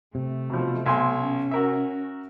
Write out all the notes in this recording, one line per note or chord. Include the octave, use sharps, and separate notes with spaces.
C3 A3
B2 F3
B1 G#5 C6
C#4
F#4 A#4 E5